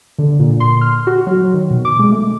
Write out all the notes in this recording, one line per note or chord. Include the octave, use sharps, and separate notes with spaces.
D3
A#2
C6
F6
F#4
F#3
D#3
B2
D6
G#3
A3